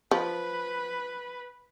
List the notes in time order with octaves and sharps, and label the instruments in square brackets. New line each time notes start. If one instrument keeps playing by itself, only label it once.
[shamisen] F3 [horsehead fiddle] B4